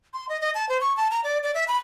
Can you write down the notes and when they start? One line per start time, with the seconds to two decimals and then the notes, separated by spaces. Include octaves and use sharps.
0.14 C6
0.29 D#5
0.41 D#5
0.55 A5
0.69 C5
0.81 C#6
0.97 A5
1.11 A#5
1.24 D5
1.43 D5
1.54 E5
1.68 B5